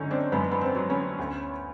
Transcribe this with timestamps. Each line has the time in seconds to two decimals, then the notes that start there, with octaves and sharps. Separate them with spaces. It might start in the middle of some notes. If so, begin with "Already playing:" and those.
Already playing: F#2 D3 C#4 D#4
0.10 C4 D4
0.32 F#2 B3
0.51 B3
0.61 C4
0.76 F#3
0.90 B3 C#4
1.19 D2